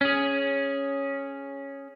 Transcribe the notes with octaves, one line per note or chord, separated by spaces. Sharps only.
C#4 G#4